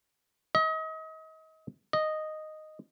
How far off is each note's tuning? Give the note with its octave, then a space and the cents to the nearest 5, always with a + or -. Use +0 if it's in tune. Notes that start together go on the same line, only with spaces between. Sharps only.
D#5 +35
D#5 -5